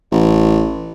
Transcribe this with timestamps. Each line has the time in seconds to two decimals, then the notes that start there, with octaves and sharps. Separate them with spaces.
0.12 A1